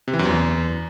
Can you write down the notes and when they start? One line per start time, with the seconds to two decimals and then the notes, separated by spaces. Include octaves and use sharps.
0.08 C3
0.13 E3
0.19 F#2
0.25 E2